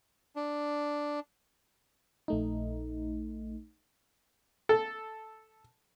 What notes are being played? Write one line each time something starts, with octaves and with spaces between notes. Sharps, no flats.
D4
A#1 A3 D#4
A4